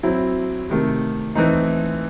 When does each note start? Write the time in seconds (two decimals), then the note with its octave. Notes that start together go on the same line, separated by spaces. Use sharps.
0.03 F#3 C4 E4
0.69 C3 D#3 A3
1.35 E3 A3 C4 D#4